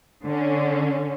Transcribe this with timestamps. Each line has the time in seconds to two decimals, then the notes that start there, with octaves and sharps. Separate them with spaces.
0.25 D3 C#4